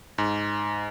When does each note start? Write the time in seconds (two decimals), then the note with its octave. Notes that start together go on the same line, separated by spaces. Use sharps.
0.18 G#2